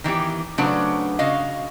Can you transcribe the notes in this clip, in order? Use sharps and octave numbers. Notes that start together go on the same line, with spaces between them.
D#3 E3 B3 G4
C#3 F#3 A3 D4 B4 C5
C#3 F#4 D#5 F5